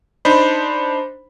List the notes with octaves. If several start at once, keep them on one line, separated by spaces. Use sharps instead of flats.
D4 D#4 C5 B5